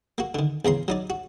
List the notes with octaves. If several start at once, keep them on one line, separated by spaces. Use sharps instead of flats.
A#3 F#4
D3 D#3
E2 C#3 A#5 C6
F#3 D#4 D5
F#4